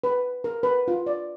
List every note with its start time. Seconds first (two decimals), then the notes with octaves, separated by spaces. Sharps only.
0.04 B4
0.44 A#4
0.63 B4
0.88 F4
1.06 D5